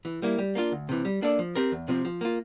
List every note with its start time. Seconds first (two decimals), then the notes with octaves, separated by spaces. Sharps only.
0.05 E3
0.22 G3 A#3 E4
0.39 G3
0.55 A#3 D4 F4
0.72 D2
0.89 C3 E3
1.05 G3
1.22 A#3 D4 A4 D5
1.39 F3
1.55 C4 G4 A#4
1.72 E2
1.88 C3 F3 C4
2.05 F3
2.21 A#3 F4